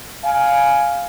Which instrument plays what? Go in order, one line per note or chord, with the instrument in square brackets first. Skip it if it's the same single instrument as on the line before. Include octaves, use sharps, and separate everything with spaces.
[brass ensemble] F5 G#5